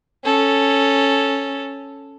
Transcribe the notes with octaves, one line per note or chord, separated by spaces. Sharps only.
C#4 A4